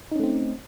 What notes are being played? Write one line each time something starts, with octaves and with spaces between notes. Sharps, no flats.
A3 C4 C#4 D#4